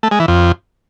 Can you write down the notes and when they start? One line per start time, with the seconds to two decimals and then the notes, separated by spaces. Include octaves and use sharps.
0.03 A3
0.11 G#3
0.20 E3
0.28 F2